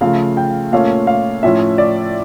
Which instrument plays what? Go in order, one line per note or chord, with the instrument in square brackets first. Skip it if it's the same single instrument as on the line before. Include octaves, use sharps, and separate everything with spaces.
[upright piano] C#3 F3 A3 F5
G5
A#2 A3 C#4 F5
F5
A2 F3 C#4 E5
D5